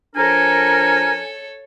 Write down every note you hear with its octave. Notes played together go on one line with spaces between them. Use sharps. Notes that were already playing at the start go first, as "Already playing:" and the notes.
F3 D4 A4 A#4 C#5 G#5